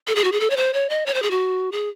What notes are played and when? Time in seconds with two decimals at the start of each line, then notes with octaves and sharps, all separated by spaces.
0.08 A4
0.15 G#4
0.24 F#4
0.32 G#4
0.40 A4
0.50 C#5
0.57 C5
0.74 C#5
0.90 D#5
1.06 C#5
1.14 C5
1.23 G#4
1.31 F#4
1.72 G#4